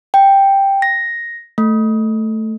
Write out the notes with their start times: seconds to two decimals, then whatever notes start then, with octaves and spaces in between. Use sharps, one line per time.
0.14 G5
0.82 A#6
1.58 A3